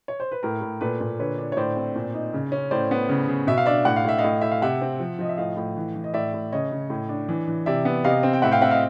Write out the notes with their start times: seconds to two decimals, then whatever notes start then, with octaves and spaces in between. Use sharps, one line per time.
0.08 C#5
0.20 C5
0.32 B4
0.43 A2 A#4
0.61 A2
0.81 A#2 A4 B4
1.01 A#2
1.19 D3 B4 C#5
1.38 D4
1.52 C#5
1.57 A2 C5 D5
1.76 C4
1.96 A#2
2.14 D#4
2.33 C#3
2.52 C#4
2.71 A2 C5 D5
2.91 B3
3.09 C#3
3.28 C#3
3.47 B2 E5
3.58 F5
3.66 D4 D5 E5
3.85 A2 F#5
3.96 F5
4.05 A2 E5
4.18 D#5 F5
4.24 A2
4.41 A2 E5
4.52 F5
4.62 C3 E5 F#5
4.82 C4
4.99 F3
5.19 F3 D#5
5.29 E5
5.38 A2 D#5 F5
5.57 A2
5.77 E3
5.96 E3
6.04 D#5
6.14 A2 D5 E5
6.34 A2
6.53 C#3 C#5 D#5
6.72 C#3
6.90 A2
7.09 D4
7.29 E3
7.47 E3
7.66 C3 D5 E5
7.85 B3
8.04 C3 D#5 F5
8.23 C4
8.33 G5
8.42 A2 E5 F#5
8.52 F5 G5
8.61 C4 E5 F#5
8.71 D#5 F5